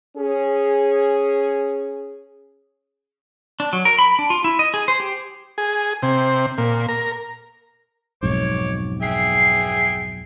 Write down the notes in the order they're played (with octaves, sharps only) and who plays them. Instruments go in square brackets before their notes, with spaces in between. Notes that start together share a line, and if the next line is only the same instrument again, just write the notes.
[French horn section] C#4 G#4
[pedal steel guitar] D4
F#3
A#4
B5
D4
F4
E4
D#5
G#4
C5
G4
[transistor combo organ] G#4
C3
A#2
A#4
[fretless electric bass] B1 F2 G#2 [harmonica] C#5 D6
[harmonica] G#4 E5 G5 [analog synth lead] C7